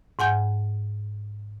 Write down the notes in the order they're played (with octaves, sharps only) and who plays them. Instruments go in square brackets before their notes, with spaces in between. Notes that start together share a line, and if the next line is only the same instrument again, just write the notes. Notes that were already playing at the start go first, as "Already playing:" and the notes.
[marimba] G#2 F#5 G#5 G6